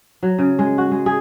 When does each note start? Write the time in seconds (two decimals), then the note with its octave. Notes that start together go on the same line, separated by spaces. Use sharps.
0.23 F#3
0.38 C#3
0.59 G#3
0.78 F#4
0.91 G#3
1.06 G#4